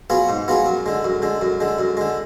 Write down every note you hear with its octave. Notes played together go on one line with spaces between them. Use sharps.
F#3 B3 F4 G#4
G#2
F#3 B3 F4 G#4
F#2
D3 G#3
F#2
D3 G#3
F#2
D3 G#3
F#2
D3 G#3